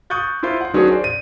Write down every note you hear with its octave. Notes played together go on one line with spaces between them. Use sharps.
C#6 D#6 F#6 G6 A6
E4 F4 C5 C6 G6
F#5 C6
D#3 F#3 C#4 D4 G#4 C5
C5 D5
D#7